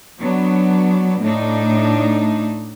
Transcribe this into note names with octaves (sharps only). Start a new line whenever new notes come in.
F#3 B3 D4
A2 D4 D#4